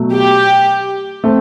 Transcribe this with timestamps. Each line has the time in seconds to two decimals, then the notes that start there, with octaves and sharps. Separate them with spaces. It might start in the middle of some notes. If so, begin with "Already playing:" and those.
Already playing: B2 F#3 A3
0.12 G4
1.24 A3 C4